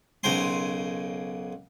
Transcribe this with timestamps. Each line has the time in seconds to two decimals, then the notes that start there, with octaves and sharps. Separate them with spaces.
0.23 B1 C#3 A#4 C5 G#5 C6